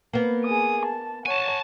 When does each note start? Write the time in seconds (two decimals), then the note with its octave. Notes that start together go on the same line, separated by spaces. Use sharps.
0.13 A#3 B3
0.45 G#4 D#6
0.85 A5
1.26 C#5 F#5 G#5 A5